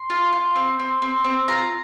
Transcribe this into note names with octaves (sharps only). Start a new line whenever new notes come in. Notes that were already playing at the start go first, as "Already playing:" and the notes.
Already playing: C6
F4
F4
C4
C4
C4
C4
F4 A#5